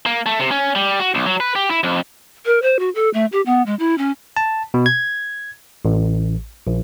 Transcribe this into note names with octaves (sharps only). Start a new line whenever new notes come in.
A#3
A3
C3
C#4
G3
F#4
B1
F#3
B4
G4
E4
F2
A#4
C5
F#4
A4
A3
G4
B3
G#3
E4
C#4
A5
B2
G#6
A1
A#1